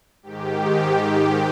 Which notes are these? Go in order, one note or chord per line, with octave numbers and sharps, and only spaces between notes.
G#2 D#3 G4